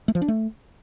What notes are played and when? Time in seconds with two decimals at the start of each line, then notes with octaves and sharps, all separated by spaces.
0.08 A3
0.15 F3
0.22 D4
0.28 A3